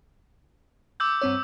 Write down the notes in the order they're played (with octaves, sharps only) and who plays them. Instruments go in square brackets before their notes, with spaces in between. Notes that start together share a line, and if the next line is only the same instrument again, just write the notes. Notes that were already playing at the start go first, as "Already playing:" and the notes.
[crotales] D6 E6 G6
[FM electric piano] G2 C4 C#5